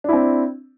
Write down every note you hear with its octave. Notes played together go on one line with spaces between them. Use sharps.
C4 D4 E4